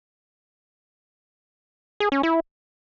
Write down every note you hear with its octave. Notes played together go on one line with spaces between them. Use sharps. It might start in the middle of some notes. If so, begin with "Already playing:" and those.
G#4
C#4
E4